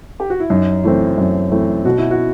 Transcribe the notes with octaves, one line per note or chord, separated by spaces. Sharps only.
G4
F#4
E4
F#2 D#4
E3 A3 C4
F#2
E3 A3 C4
B2 F#4
E4
F#4